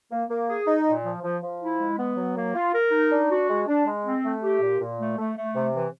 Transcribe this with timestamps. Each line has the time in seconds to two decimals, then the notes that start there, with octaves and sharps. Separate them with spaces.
0.10 A#3
0.28 A#3
0.47 G#4
0.67 D#4
0.84 A#2
1.04 F3
1.23 F3
1.42 F3
1.61 E4
1.79 G#3
1.98 B3
2.16 F#3
2.36 A#3
2.55 F4
2.74 A#4
2.91 D#4
3.11 D4
3.30 F#4
3.49 G#3
3.67 D4
3.86 G#3
4.05 C4
4.24 A3
4.42 G4
4.61 A#2
4.80 A#2
4.98 A3
5.18 A3
5.36 A3
5.54 C3
5.74 E3